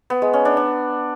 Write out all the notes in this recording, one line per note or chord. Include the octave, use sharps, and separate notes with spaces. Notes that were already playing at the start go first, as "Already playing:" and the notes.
B3
G#3
C#4
D4
D4